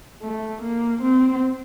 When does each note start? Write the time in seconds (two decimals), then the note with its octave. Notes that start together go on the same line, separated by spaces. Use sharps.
0.22 A3
0.62 A#3
1.02 C4